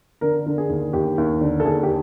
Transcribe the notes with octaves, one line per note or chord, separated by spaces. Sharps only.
D3 A#4
D3
G#4
D#2
D#2 G4
D#2
D3
A4
D#2 G#4
G4